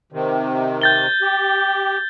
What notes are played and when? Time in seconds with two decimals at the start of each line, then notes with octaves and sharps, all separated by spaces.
0.12 C3 D#3
0.82 G6 A6 G7
1.21 G4